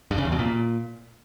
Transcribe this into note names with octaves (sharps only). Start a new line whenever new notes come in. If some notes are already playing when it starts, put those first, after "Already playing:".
G2
C#3
E2
B2
A#2